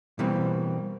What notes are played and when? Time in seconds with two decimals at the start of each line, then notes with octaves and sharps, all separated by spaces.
0.19 B2 E3 G3 A#3 C4